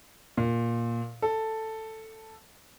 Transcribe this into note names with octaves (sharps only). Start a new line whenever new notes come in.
A#2
A4